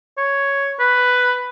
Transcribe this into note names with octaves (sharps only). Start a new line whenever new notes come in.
C#5
B4